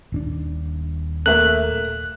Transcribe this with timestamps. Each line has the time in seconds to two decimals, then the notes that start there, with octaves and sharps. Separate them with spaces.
0.12 D#1 C#4 D4
1.26 A3 A#3 E5 F#6